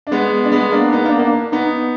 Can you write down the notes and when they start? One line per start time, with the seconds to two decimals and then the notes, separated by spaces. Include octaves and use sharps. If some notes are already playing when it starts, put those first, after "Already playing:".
0.07 D4
0.11 G#3 B3
0.44 D4
0.52 G#3 B3
0.72 A#3 D4
0.92 B3 D#4
1.05 A#3 D4
1.19 A#3 D4
1.52 B3 D#4